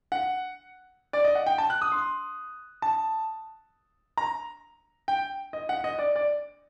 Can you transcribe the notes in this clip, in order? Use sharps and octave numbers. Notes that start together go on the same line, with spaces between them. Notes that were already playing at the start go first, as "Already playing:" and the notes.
F#5
D5
D#5
F#5
G5
A5
F#6
D#6
C6
A5
A#5
G5
D#5
F#5
D#5
D5
D5